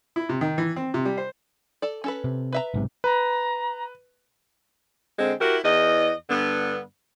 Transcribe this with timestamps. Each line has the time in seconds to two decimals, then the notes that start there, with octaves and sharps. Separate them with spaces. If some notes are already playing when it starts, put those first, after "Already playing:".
0.16 E4
0.29 C3
0.41 D#3
0.58 E3
0.76 C4
0.94 C3
1.05 G3
1.17 C5
1.82 A4 D5
2.04 C#4 A4 B4
2.24 C3
2.53 B4 E5 A#5
2.74 B1 G#2 C3
3.04 B4 A#5
5.19 D3 G#3 C4
5.41 E4 F#4 G4 A#4
5.64 E2 D#5
6.30 G2 D3 B3